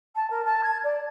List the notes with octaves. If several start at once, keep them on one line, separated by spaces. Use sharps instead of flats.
A5
A#4
A5
G#6
D5